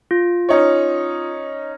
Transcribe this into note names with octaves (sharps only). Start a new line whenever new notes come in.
F4
C#4 D#4 C#5